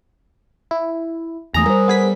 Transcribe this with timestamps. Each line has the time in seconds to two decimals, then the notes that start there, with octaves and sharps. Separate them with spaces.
0.71 E4
1.54 E2 E3 A3 G#5 A#5 D#6
1.66 G3 A#4 C5
1.88 B3 G#4 B6